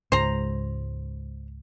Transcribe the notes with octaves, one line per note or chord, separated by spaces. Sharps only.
C#2 G#2 C5 A#5